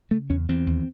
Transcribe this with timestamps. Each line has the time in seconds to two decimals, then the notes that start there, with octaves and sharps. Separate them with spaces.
0.11 C#3 A3
0.30 E2 C#4
0.49 E2 C4
0.67 D#2